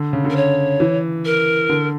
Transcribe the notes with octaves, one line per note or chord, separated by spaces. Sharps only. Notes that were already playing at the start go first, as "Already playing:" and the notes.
Already playing: D3
C#3
D3
A#4
C#5
E3
A#4
D3